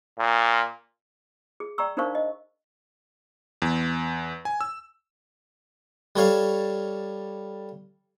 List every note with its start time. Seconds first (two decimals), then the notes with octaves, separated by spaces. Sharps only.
0.19 A#2
1.60 G#4
1.78 D5 G5 A#5 C#6 E6
1.97 D4 D#4 A#4 C5 F5 C#6
2.15 D#5
3.62 E2
4.45 G#5
4.61 E6
6.16 G3 A4 C#5 F5